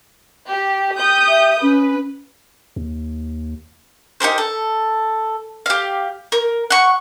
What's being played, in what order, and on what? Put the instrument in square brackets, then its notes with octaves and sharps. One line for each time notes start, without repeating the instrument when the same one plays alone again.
[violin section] G4
G4 D#6 G6
[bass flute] E5
[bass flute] C#4 [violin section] B4
[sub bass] D#2
[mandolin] D#4 G4 A#4 C5
A4
G4 F5
A#4
F#5 C#6